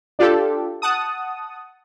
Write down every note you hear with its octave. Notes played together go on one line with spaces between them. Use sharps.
D4 F4 G4 A4
F#5 A5 D#6